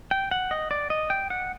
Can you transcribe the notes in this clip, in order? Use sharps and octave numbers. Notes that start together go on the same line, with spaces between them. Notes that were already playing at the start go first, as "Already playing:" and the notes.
G5
F#5
D#5
D5
D#5
G5
F#5